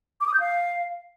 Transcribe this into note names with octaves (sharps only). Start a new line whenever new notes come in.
D6
D#6
G6
F5